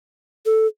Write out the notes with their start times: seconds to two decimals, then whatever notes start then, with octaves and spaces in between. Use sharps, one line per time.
0.46 A4